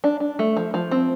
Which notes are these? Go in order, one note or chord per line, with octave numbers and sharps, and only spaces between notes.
D4
D4
A3
F3
F3
C4